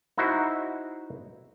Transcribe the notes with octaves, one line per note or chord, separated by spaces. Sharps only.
D#4 E4 F#4 C5